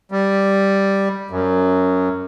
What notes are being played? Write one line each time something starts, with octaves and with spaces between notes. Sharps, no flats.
G3
F#2